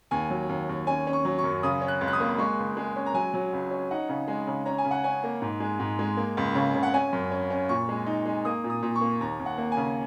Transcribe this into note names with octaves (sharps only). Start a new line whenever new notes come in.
D#2 G#5
F#3
D#2
D#2
C#4 G#5
C#4
C#6
F#3
C#6
F#2
C#3 D#6
C#4
F#6
C#2
F#6
D#6
A#3
G#3 C#6
C#2
G#3
C#4
A#5
F#3 G#5
F#3
C#2
C#4
D#4 F#5
C#3
G#3
C#3
C#4 A#5
G#5
C#3
F#5
C#4 G#5
A#3
G#2
G#3
G#2
G#3
A#3
C#2
C#3
C#3
F#5
C#4 G#5
F#2
C#4
C#4
A#2 C#6
G#3
D#4
G#3
A#3 D#6
A#2
D#6
A#2
C#6
A#3
D#2 A#5
D#2
F#5
A#3
G#5
C#3